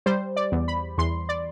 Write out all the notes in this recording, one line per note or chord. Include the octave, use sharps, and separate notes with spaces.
G3 C5
D5
E2
B5
E2 C6
D5